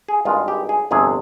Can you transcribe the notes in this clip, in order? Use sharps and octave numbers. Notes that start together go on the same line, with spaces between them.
G#4
G#1 G2 D#3 G#3 F4
G4
G#4
G1 F2 C3 G#4